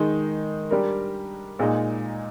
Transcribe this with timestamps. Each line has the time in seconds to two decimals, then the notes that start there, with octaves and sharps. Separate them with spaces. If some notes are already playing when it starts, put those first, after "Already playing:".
Already playing: D#3 G#3 D#4
0.71 G3 D4 G4 A#4
1.59 A#2 G#3 D#4